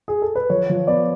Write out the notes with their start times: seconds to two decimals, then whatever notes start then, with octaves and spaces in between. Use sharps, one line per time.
0.08 G#4
0.22 A4
0.35 B4
0.50 F3 C#5
0.70 F3
0.87 B3 D5